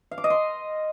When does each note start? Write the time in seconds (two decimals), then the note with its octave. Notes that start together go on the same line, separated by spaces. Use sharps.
0.11 F5
0.18 D6
0.24 D#5
0.30 C6